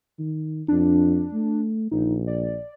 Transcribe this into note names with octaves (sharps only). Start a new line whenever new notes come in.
D#3
F2 D4
A3
A#1 D#4
D5